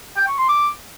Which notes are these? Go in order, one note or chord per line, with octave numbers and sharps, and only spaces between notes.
G5
C#6
C6
D6